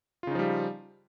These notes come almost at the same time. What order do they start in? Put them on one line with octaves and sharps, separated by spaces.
F4 C#3 D#4 F3 G3